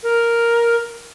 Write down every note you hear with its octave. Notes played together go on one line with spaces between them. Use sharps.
A#4